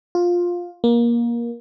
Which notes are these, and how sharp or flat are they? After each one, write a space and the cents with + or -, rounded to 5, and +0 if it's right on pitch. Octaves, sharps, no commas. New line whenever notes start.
F4 +10
A#3 +20